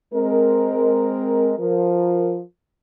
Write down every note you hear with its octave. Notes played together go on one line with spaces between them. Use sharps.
G#3 C4 A#4
F3 A#4